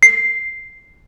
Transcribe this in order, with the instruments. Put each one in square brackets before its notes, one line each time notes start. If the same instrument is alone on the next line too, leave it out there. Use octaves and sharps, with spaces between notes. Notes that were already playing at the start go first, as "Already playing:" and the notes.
[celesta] C7